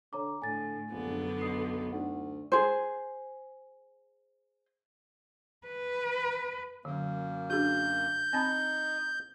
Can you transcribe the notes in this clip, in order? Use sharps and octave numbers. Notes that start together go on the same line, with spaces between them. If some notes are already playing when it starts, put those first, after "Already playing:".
D3 C#5 A#5 D6
A2 D3 G#5 A6
A#1 F#2 D3 B3
B1 D#6 C7
D2 D#4 F#5
G#4 C5
B4
F#2 D3 F#3 A#3
D4 F#4 G#4 G6
C4 D#4 A5 B5 A#6